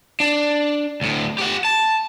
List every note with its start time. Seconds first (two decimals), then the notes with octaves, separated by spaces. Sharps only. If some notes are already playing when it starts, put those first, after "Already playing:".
0.20 D4
1.01 D2 A2
1.38 G4 F#5
1.65 A5